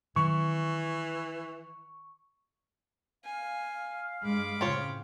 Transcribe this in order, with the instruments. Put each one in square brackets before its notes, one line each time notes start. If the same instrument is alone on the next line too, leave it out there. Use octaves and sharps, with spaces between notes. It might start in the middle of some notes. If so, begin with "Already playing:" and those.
[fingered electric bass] D#3 F#3 C4 [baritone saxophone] E3 [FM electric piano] C#6
[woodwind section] F5 [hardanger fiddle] G#5
[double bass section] G2 G#3 [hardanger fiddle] B5 D6
[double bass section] A2 C#3 [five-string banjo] C4 F4 C#5